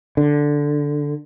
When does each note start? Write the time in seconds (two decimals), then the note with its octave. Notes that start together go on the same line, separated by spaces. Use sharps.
0.17 D3